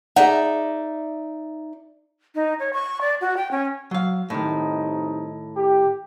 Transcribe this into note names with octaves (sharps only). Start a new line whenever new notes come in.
D#4 G#4 D5 E5 F#5
D#4
C#5
C#6
D5
F#4
G5
C#4
F#3 F5
C2 A2 D#3 D#4
G4